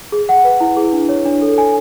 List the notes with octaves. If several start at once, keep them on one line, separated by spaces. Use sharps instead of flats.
G#4
F#5
B4
E4
G#4
D4
C#5
D4
A4
G#5